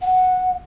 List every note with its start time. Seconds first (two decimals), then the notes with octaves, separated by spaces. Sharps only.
0.02 F#5